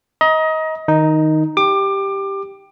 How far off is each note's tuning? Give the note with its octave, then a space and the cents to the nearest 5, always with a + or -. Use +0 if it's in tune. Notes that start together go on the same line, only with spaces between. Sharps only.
D#5 +25 A#5 +30
D#3 +0 D#4 +0
G4 +0 D6 +25